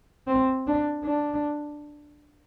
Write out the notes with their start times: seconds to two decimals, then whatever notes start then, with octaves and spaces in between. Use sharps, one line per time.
0.28 C4
0.67 D4
1.05 D4